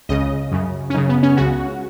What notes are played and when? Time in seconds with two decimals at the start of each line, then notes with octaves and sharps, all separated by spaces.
0.09 C#2 C#3 D#5
0.52 F#2 C#3
0.90 C#4
0.94 F#2 C#3 D#4
1.09 B3
1.23 C#4
1.37 C#2 C#3 F#4